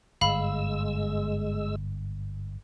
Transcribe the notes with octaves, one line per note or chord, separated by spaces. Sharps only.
G1 G#2 G#3 F5 B5 E6